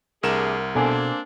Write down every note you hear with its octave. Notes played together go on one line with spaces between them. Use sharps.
C2 A3 D4 G#4 A#4 E7
B2 A#3 C4 D4 A4 G#5